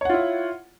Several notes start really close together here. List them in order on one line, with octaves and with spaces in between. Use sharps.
C#5 F#5 F4 E4